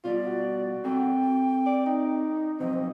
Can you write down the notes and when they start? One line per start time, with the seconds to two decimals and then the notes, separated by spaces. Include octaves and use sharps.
0.04 B2 G3 F4 D5
0.27 F#4
0.84 C4 A4 A#4 G5
1.66 D5
1.86 D#4
2.60 B2 F3 F#3 C4 D#5